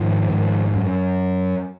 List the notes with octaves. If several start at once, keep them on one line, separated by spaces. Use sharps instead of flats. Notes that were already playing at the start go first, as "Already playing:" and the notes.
Already playing: G#2 D#3 F3
G#2
F#2